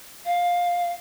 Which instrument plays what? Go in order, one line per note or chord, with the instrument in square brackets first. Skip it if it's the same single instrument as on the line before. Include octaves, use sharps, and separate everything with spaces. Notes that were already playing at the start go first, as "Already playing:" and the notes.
[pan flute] F5